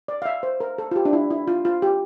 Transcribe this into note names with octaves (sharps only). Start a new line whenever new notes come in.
D5
F5
E5
C5
A#4
A4
F4
G4
D4
E4
E4
F4
F4
G4